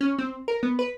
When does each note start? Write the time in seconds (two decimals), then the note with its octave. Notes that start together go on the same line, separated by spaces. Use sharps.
0.01 C#4
0.19 C4
0.48 A#4
0.63 B3
0.79 B4